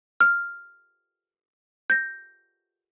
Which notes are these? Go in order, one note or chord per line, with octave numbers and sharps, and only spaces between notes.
F6
G6 A#6